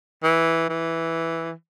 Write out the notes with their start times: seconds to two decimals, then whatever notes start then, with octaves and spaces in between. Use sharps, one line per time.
0.23 E3
0.70 E3